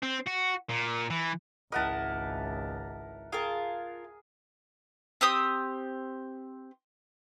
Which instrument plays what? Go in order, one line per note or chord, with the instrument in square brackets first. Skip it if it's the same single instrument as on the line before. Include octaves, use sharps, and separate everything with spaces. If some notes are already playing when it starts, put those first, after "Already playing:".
[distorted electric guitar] C4
F#4
A#2
E3
[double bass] G#1 C#2 [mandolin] E4 D#5 [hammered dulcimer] A#4 F#5 A5
[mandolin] F4 A#4 A5 [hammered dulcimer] G#4
[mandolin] C4 G4 D#6